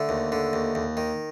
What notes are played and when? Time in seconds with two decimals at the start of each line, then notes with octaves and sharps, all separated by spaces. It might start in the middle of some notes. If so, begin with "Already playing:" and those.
Already playing: D3 A3
0.09 D#2
0.32 D3
0.53 D#2
0.75 D#2
0.97 D#3